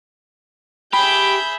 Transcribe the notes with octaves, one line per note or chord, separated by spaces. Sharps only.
G4 G#4 E5 B5 G6